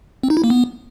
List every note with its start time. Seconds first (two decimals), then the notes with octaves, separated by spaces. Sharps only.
0.23 C4
0.30 D#4
0.37 E4
0.44 A#3
0.50 B3